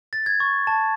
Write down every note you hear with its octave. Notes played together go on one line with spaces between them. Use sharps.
A6
G#6
C#6
A5